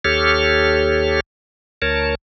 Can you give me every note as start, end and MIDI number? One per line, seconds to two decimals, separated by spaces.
0.05 1.20 39
0.05 1.20 67
0.05 1.20 69
0.05 1.20 73
0.05 1.20 89
1.82 2.15 38
1.82 2.15 70
1.82 2.15 73
1.82 2.15 81